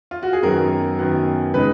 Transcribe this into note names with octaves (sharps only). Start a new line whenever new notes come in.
F4
F#4
G#4
F#2 D#3 F#3 B3 A#4
F#2 D#3 F#3 B3
C#3 G#3 D#4 B4